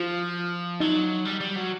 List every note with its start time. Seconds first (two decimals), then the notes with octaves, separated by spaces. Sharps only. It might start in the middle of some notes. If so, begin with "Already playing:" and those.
Already playing: F3 F4
0.80 F#3 D#4
1.25 G3
1.40 G3
1.55 F#3